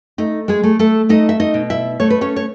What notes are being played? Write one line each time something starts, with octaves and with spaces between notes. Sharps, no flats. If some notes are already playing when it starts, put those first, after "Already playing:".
A3 D#4
G#3 G#4
A3
A3 A4
A3 D#4 D#5
E5
D#4 D#5
B2
E4 E5
A3 C#5
B4
C#4 C#5
C#5